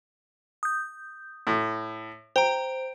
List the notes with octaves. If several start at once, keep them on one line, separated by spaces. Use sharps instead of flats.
D#6 G6
A2
C5 G5 A#5